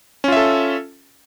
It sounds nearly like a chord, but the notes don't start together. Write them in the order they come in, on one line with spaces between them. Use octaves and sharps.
C#4 F4 E5 A4